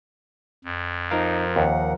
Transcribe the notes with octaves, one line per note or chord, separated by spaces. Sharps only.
F2
F3 D#4 A#4 F5
D#2 F#5